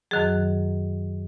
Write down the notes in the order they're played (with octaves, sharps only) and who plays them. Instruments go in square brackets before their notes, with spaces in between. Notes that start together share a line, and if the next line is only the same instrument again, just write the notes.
[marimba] F#2 D#3 F#3 G#4